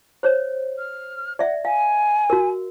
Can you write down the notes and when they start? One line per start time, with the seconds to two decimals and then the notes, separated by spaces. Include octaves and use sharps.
0.23 C5 C#5
0.78 F6
1.39 D5 E5 F#5
1.65 F5 G#5
2.30 F#4 A#4